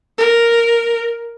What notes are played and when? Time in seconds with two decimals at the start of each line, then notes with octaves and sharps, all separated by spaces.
0.18 A#4